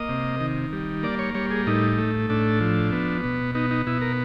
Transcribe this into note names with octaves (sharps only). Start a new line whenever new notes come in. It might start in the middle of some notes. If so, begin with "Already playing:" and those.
Already playing: A#3 D#5
C3
D#3
G3
A#3 D5
C#5
G3 C#5
G#4
A2 D#4
A3
A2 D4
F3
B3
B2
B3 D#4
D#4
B2 E4
A#4